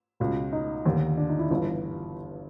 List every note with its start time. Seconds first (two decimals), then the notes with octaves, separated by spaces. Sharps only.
0.20 C#2 B2
0.53 D#4
0.86 D#2 D3
1.17 D4
1.29 D#4
1.39 E4
1.50 G1 G2 E3 F4